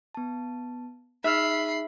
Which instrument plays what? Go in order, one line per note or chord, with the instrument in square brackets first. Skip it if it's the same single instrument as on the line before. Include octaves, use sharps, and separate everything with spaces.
[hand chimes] B3 A5
[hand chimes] D#4 G#4 [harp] E5 F6 [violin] B5 C7